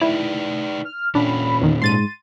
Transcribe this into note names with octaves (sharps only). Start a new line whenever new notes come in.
D#4 E4 B4 D5
F6
A#2 C#4 D4 B5
E2 D#3
G#2 C6 A6 D#7